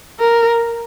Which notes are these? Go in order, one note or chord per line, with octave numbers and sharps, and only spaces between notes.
A#4